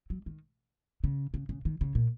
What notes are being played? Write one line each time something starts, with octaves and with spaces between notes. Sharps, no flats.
F#3
D#3
C#3
C#3
C#3
D#3
C#3
A#2